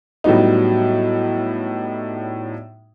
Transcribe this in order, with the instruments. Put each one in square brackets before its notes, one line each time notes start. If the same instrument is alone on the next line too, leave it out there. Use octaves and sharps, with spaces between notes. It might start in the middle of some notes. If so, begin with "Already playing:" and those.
[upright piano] A2 F#3 G3 B3 D#4